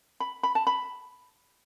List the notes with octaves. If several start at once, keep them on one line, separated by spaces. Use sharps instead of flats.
B5
B5
A5
B5